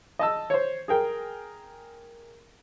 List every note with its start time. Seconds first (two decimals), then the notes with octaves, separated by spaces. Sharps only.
0.19 D#5 A5 E6
0.50 C5 C#5
0.88 G#4 A#4 G5